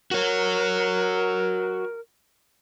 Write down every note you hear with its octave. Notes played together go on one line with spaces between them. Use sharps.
F#4 A#4 C#5